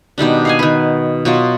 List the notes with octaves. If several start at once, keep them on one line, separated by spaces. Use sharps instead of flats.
B2 D#3 G3 D4
F5 F#5 G#5
D#3 B4
B2 F#3 F4